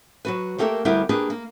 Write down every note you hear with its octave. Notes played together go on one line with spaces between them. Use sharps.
F#3 F#4 B4
A3 A#3 G4 A4 A#4
D2 G3 B3 E4 G4 A#4
A#3 D4 G4 G#4 B4
A#3